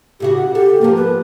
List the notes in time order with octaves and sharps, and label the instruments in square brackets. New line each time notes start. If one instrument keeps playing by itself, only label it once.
[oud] A2 C#3 F#4 [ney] G4
[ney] F#5
[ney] G4 [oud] A4
[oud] G#2 F3 [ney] A#3
[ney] B4